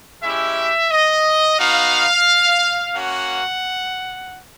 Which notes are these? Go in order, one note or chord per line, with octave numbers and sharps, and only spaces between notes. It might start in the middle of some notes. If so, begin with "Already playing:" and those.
G#3 C#4 E4 G4 E5
D#5
B3 D#4 F#4 F5
A#3 C#4 F#4 F#5